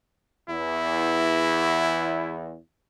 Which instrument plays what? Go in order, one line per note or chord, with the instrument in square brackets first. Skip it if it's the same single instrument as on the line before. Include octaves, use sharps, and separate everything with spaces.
[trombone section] E2 [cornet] E4